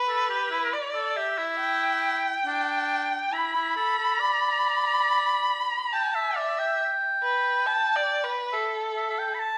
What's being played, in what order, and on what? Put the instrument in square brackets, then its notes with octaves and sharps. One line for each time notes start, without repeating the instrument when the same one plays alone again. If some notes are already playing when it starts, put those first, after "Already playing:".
Already playing: [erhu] B4
[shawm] A4
G4
E4
[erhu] D5
[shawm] A4
[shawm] G4 [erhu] E5
[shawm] E4
[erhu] G5
[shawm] D4
[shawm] E4 [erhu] B5
[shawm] E4
[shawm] A4 [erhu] B5
[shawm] A4
D5
[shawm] G5 [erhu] A5
[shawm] E5
[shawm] D5 [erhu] E5
[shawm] G5
[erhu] B4
A5
D5
B4
[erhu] A4 [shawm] E5
[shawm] E5
E5
G5
B5
A5